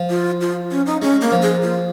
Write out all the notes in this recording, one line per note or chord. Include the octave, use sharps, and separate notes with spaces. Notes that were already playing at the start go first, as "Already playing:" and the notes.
Already playing: F3
F4
F4
C#4
D#4
G#3 C#4
A#3
F3
G#4
F4